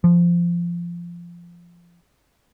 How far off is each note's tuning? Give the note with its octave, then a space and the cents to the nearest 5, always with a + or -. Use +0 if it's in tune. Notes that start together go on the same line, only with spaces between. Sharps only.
F3 -15